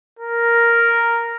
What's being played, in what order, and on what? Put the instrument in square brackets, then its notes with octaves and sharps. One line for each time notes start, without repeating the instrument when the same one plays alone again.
[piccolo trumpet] A#4